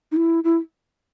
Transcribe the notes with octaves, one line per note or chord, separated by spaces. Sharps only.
D#4
E4
E4